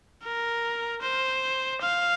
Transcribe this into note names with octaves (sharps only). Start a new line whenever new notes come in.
A#4
C5
F5